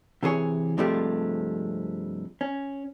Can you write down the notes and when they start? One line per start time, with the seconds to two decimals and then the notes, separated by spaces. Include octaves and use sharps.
0.23 C3 E3 G#4 C#5
0.78 G2 C3 F3 G#3 A3 G4
2.41 C#4